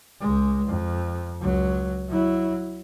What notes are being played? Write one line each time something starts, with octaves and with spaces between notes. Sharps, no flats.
C#2 G#3
F2
C#2 F#3
F#3 E4